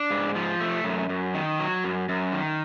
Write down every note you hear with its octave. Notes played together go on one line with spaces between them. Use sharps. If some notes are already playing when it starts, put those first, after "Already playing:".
Already playing: D4
G#2
F3
A3
F#2
F#2
D#3
F#3
F#2
F#2
D#3